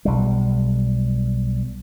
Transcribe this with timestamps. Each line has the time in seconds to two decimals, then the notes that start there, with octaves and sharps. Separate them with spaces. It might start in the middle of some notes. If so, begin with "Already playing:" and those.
0.05 B1 G3